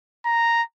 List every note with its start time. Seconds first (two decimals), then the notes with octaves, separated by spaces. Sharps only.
0.25 A#5